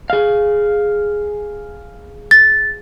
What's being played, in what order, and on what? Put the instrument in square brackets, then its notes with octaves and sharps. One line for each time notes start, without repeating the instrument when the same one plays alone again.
[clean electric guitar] G#4 F5
[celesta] A6